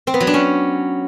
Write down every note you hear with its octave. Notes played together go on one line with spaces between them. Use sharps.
C4
B3
F#3
D4
C#4